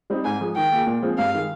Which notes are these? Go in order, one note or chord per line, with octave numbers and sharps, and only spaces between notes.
G3 C4 D#4
G#2 G#5
F3 G#3
D#3 G5
A#3 F4 G#4
A#2
F3 G#3 C4 F4
G2 F5
D#3 G#3